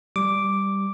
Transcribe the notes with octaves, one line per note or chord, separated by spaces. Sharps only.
G3 D6